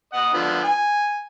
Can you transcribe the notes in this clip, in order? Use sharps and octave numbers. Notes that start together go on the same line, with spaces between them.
D#5 F#5
D3 F3 B3
G#5